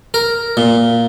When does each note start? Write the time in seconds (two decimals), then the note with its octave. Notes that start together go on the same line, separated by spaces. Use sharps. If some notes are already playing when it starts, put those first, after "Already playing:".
0.14 A#4
0.57 A#2